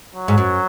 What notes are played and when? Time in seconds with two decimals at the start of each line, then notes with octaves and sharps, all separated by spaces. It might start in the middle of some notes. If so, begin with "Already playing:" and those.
0.15 F#3
0.28 G#2
0.38 F#2